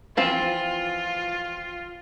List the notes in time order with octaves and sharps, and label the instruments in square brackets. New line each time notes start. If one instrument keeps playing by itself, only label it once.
[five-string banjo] E3 F3 C4 [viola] F4